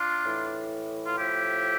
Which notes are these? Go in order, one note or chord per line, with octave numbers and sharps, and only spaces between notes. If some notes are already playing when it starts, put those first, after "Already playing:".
Already playing: D4 F4
A2 E3
F4
A2 F3 E4 G4